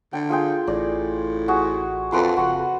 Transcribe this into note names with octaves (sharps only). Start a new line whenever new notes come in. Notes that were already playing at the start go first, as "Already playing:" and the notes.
D3 G5
F4 G#4 G5
A1 A2 D5
F#4 G#4
F2 B4 A5 C6
F#1 F2 F#4 F#5